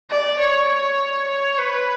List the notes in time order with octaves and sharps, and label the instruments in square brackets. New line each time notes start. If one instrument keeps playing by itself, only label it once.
[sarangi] D5
C#5
C#5
C#5
B4